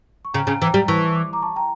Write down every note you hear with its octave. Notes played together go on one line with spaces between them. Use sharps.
C#6
C#3 G5 A#5
C#3
E3 G5 A#5
G3
E3 A5 C#6
D6
A#5 D6
A5 C#6
G5 A#5